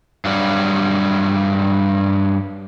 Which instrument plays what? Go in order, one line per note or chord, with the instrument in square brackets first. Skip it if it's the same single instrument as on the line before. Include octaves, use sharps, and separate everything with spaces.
[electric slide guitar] G2 F#3 G3